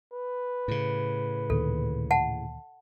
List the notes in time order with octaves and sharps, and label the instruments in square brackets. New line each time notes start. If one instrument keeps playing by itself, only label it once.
[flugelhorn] B4
[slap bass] A2 C#3
[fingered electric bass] D2 A#2 D#3 [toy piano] A4
[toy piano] F#5 A5